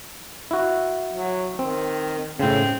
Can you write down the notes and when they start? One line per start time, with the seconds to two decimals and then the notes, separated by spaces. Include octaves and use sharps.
0.51 E4 F#4
1.14 F#3
1.59 D#3 C4
2.40 A2 C#3 C4